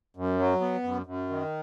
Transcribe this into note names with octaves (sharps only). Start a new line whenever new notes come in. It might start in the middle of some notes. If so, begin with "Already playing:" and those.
F#2
F#3
B3
F#2
F#2
D#3